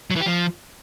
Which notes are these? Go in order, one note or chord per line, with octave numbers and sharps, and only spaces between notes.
F#3
E3
G4
F3